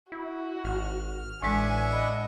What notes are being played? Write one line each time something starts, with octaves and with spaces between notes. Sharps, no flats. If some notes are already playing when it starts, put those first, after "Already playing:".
E4 F#4
G#1 F6
A1 A2 G#3 D4 E5 F#5 G#5
D#5 B5